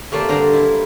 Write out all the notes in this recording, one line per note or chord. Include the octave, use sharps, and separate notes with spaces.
C3 A3 A#3 D5
G2 D3 C5 A#5
E4